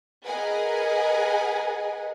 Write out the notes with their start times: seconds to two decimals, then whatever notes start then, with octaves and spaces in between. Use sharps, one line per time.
0.25 G#4 A#4 B4 D#5 F#5 G#5